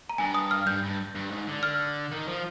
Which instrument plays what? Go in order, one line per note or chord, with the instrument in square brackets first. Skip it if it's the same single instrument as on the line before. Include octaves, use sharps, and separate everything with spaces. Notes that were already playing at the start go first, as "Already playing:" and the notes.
[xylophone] A#5
[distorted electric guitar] G2 [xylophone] G#5
[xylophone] D#6
F6
[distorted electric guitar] G2 [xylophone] G6
[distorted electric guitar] G2
G2
G#2
D3
[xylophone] F6
[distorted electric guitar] D#3
F3